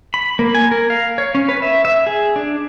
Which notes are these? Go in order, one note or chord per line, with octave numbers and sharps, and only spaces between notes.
B5
A#3
G#5
A#4
F5
C#5
C#4
B4
E5
E5
G#4
D4